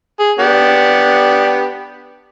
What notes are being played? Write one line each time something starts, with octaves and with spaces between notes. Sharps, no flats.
G#4
B3 D4 G4